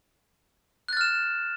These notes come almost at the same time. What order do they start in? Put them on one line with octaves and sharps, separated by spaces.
F#6 A6 F6 E7